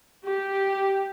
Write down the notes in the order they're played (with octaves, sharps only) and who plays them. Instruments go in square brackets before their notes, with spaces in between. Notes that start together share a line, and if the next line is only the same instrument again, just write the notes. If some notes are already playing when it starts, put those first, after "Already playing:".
[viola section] G4